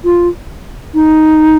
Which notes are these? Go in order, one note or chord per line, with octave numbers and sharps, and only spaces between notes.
F4
D#4